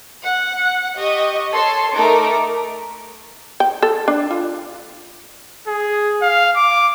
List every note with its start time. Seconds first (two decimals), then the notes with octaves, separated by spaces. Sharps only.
0.22 F#5
0.96 G4 D#5 C#6
1.51 A4 C#5 A5 C6
1.94 A3 D#4 A4 A#4 D6
3.60 G5
3.83 A4
4.08 D4
4.31 F4
5.67 G#4
6.22 F5
6.56 D6